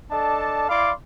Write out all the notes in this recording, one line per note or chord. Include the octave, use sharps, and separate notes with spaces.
D4 A4 D5 D#5 A5
E4 D5 F5 B5 C6 D6